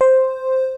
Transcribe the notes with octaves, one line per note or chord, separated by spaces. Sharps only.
C5